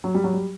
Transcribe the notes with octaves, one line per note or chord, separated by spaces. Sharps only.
F#3
G3
F#3
G3